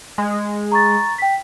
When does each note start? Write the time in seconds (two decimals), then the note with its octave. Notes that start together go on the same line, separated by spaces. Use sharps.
0.18 G#3
0.72 A#5 C#6 A6
1.18 G5 B6